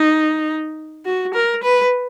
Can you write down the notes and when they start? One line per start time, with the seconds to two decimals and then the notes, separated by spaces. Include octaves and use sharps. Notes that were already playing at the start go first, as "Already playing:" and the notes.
Already playing: D#4
1.06 F#4
1.34 A#4
1.63 B4